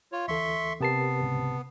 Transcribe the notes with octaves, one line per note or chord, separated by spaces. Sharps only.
F4 C#5
D2 E3 A4 E5 C6 C#6
C3 B3 G4 A#4 B4 A5 C7
C2 G#2 C#3